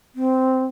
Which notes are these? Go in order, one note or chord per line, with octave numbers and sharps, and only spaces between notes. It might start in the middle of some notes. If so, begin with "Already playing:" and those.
C4